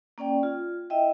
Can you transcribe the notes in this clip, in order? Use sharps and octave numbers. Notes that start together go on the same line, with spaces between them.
A#3 C#4 D5 G5
F4
E4 D#5 E5 G5